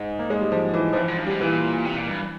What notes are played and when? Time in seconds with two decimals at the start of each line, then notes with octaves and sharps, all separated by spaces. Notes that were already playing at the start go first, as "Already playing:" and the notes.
Already playing: G#2
0.19 A#3
0.30 G#3
0.41 G3
0.52 F3
0.74 E3
0.93 F3
0.96 G2 E3
1.08 G#2
1.18 G2
1.27 G3
1.30 G#2
1.40 A#2 E3
1.85 C3
1.97 A#2
2.07 G2